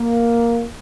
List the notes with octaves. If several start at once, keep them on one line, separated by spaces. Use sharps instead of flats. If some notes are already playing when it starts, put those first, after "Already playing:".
Already playing: A#3